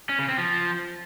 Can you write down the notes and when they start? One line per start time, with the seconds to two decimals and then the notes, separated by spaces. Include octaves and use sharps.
0.09 C#4
0.19 C#3
0.28 C4
0.38 F3